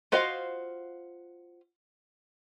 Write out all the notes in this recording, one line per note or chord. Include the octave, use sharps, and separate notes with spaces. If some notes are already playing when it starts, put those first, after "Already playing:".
F4 F#4 C5 D#5 F5